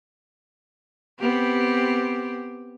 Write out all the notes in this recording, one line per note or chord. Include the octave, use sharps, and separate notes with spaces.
B3 C4 G4